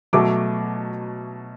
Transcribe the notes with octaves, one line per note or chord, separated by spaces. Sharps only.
B2 F#3 A3 D6